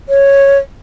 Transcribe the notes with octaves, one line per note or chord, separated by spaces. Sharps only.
C#5